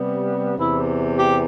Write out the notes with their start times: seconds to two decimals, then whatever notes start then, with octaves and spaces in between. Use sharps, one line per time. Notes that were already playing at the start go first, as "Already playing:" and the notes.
Already playing: C3 G3 B3
0.58 E2 C3 E3 E4
1.18 G4